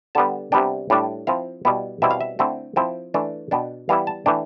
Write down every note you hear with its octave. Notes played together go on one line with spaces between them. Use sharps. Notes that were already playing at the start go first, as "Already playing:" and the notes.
D3 G3 B3 A5
C3 G3 B3 D4 G5
A2 G3 D4
F3 C4 E4 F5
B2 G3 B3 E4
B2 G3 C4 E4 E5
F5
E5
D3 A3 C4 E4
F3 C4 E4 G5
E3 A3 D4
B2 B3 D4 G5
E3 G3 B3 E4 F5
A5
E3 A3 D4 G5